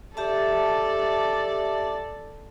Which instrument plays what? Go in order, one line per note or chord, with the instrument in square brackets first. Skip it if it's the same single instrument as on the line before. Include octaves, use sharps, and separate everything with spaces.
[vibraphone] G4 E5 A5 [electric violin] A4 D5